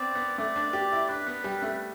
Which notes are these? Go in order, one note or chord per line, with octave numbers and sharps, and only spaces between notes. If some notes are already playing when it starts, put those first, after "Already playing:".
Already playing: B3 C4 D5
B3
A3 D5
D4
G4
E4
D4 B4
B3
G3
A3